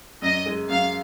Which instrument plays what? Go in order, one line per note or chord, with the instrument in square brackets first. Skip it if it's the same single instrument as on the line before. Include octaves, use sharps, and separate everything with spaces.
[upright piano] F#2 [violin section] D#5
[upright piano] G#3
[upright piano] F#2 [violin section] F5